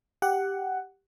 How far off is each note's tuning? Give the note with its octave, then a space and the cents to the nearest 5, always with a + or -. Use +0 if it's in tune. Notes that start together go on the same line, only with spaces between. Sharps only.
G4 +0 F#5 +10